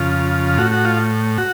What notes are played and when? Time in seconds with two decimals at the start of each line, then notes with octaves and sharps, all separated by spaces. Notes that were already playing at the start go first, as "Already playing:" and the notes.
Already playing: F2 C#3 F4
0.58 A2 F#4
0.72 F#4
0.85 F4
1.38 F#4